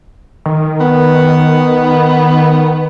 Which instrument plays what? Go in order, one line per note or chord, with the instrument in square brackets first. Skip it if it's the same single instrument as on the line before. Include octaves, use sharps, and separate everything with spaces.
[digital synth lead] D#3
[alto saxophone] B3